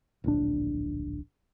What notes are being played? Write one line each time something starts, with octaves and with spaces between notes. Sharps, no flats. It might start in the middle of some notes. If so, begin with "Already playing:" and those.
D1 A#1 D4